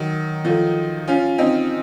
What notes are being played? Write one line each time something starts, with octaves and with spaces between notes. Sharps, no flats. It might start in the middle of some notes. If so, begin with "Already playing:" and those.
Already playing: D#3 F#3
F3 A3
C#4 F4
C4 D#4